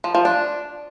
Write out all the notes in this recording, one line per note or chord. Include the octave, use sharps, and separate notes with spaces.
F3
F3
D4